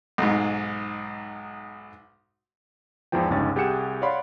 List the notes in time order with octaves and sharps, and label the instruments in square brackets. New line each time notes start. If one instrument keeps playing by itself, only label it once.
[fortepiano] B1 G#2
[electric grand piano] E2 G#2 E3 F3 G5
G1 C#2 G2 C#4 D#4 A6
C2 G4 G#4 F#5 C#7 E7
C#5 D5 F5 F#5 B5 C6